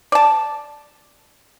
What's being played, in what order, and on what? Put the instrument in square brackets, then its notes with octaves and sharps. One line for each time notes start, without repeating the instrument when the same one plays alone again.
[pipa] D5 A5